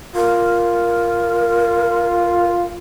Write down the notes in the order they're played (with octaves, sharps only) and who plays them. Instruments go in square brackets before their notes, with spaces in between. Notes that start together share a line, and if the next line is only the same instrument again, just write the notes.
[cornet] F4 [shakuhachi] A#4